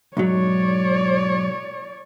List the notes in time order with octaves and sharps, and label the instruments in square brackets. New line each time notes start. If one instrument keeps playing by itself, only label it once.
[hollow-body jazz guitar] B1 G#2 F#3 [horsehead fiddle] C#5 D5